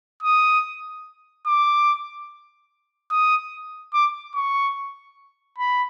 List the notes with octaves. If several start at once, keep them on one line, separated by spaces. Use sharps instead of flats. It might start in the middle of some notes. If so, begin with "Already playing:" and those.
D#6
D6
D#6
D6
C#6
B5